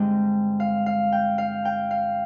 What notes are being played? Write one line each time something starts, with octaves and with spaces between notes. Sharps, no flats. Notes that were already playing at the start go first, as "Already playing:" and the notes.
Already playing: G2 D3 G#3 C4 G5
F5
F5
G5
F5
G5
F5